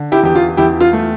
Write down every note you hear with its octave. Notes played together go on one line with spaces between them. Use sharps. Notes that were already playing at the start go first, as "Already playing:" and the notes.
Already playing: D3
E4 G4
E2 G4
F4
E2 E4 G4
F4
A3